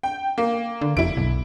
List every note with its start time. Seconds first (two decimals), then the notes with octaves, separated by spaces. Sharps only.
0.03 G5
0.38 A#3
0.81 D3
0.97 F1 E4 D7
1.17 B1